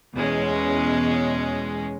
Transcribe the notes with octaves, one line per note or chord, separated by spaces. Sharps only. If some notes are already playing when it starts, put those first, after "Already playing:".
E2 B2 G#3 C#4